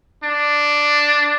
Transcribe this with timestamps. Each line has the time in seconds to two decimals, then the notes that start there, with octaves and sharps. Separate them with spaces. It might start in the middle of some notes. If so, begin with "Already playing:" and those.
0.24 D4